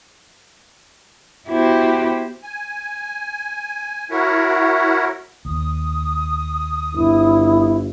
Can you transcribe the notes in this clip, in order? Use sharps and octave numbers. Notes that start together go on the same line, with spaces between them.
B3 E4 F#4 G4 C5
G#5
E4 F#4 A#4 C#5 E5 F#5
D#2 D#6
G1 E4